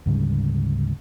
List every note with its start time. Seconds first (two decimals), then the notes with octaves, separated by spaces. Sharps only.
0.06 D2 G#2 C#3 G3